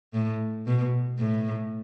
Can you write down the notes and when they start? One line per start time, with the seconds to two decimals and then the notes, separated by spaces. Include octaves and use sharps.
0.14 A2
0.67 B2
1.19 A2